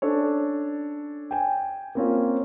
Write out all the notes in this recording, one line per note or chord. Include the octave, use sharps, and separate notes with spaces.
C#4 D4 A4 C#5
G5 G#5
A#3 C4 C#4 F4